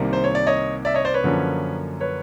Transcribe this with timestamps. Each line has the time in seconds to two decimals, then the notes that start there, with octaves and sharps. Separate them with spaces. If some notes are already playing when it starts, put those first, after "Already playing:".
Already playing: C2 C3 D#3 G3 A#3
0.13 C5
0.24 C#5
0.35 D5
0.47 C#5 D#5
0.85 D5 E5
0.94 C#5 D#5
1.05 C5 D5
1.14 B4 C#5
1.24 F#2 D3 F3 A#3 C#4
2.01 B4 C#5